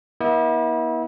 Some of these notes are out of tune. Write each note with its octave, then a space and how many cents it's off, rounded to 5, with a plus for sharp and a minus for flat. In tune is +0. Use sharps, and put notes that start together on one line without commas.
B3 -45 E4 -35